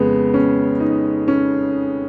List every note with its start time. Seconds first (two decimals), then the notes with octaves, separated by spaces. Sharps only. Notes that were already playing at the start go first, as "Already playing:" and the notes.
Already playing: F2 C#3 G#3 B3
0.34 C#4
0.80 D#4
1.28 C#4